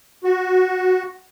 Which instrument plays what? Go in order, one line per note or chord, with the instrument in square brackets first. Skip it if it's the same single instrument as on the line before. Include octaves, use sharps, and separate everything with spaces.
[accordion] F#4